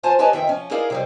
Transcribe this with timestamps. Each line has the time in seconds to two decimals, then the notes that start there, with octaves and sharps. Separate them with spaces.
0.03 D#2 F4 C5 G#5 A5
0.19 G4 B4 C#5 D#5 G#5 A5
0.33 F2 D#3 C4 E5 G5
0.47 F3 C#4
0.71 D#4 E4 G#4 A#4 D5 F5
0.90 C3 F#3 G3